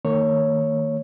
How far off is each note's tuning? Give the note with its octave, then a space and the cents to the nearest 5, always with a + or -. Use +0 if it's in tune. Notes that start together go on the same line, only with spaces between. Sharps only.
D#3 +0 A#3 -35 C#5 +0